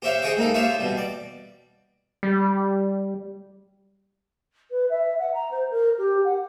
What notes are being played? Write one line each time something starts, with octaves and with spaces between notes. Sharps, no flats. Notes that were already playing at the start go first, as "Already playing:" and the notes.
G4 C5 C#5 E5 F5
G#4 C5 C#5 D#5 G5
G#3 A#3 D#4 A4
F4 G4 C5 C#5 E5 F5
B2 G3
D5
G3
B4
E5
F#5
A#5
C5
A#4
G4
F#5